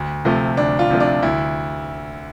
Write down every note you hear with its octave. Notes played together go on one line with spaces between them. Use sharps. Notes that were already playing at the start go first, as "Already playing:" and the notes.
Already playing: D2
C3 F3 A3
D2 D4
F4
C3 F3 A3
D4
D2 E4